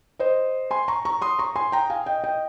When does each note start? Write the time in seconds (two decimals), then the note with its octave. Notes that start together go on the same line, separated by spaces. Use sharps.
0.19 C5 D#5
0.71 G#5 C6
0.88 A#5 C#6
1.05 A#5 C#6
1.22 C6 D#6
1.39 A#5 C#6
1.56 G#5 C6
1.72 G5 A#5
1.90 F5 G#5
2.06 D#5 G5
2.24 D#5 G5